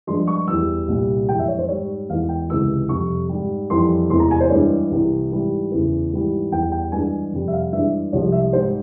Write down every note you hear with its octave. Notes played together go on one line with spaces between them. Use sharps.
G2 F3 G#3 C6
C#6
E2 E3 G3 E6
C2 A#2 G3
F2 E3 G#3 G5
E5
C#5
C5
G#2 G3 C#5
E2 E3 G#3 F5
G5
C#2 C3 E3 G#3 E6
F2 C3 G3 C#6
G#2 G3
F2 E3 G3 C6
E2 C3 E3 G#3 C6
A#5
G#5
C5
G2 E3 G#3 C#5
C2 C3 E3
G#2 E3 G3
E2 C#3 E3
G#2 E3 G3
E2 E3 G3 G5
G5
G2 E3 G#3 G#5
F2 C3 G3
E5
F5
G2 E3 G#3 E5
C2 C3 F3 G#3 C#5
E5
G#2 G3 C5